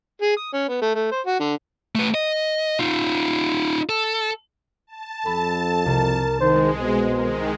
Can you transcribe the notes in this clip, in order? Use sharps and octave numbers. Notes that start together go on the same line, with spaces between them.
G#4
D#6
C#4
B3
A3
A3
C5
F#4
D3
A3 B4
D#5
D#4 F4
A4
A5
F2 A4 B5
C2 A#4
D#3 G#3 C5
B2 C5
D#3 G#3 A#4